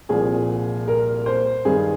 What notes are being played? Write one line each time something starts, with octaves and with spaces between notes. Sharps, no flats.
C2 A#2 F3 G#4
A#4
C5
G2 D#3 G#4